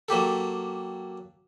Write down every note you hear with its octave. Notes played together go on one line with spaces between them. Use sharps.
F#3 A#3 G4 A4